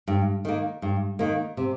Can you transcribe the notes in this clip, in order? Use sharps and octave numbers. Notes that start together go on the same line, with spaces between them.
G2
D#3 A#3
G2
D#3 A#3
C3